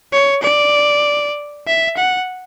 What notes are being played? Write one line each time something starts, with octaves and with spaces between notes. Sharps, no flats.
C#5
D5
E5
F#5